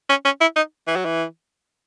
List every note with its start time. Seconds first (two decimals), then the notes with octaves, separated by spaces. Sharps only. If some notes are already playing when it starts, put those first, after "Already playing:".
0.10 C#4
0.25 C#4
0.41 E4
0.56 D#4
0.88 E3
0.96 F#3
1.05 E3